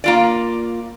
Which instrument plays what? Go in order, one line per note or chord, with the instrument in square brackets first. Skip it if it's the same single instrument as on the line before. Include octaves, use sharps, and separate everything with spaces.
[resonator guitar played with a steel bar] A#3 F4 D5